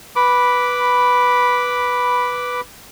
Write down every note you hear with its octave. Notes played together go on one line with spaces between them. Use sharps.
B4 B5 D6